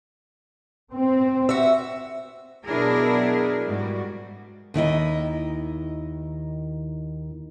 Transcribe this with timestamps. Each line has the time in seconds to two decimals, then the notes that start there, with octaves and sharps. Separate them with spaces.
0.93 C4
1.49 F#4 E5
2.65 B2 F#3 D4 E4 G#4 A#4
3.66 G#2 G3 F#4
4.74 D#2 D#3 E4 D#5